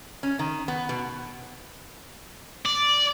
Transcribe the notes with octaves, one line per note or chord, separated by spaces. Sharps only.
C#4
D#3
B3
B2
D5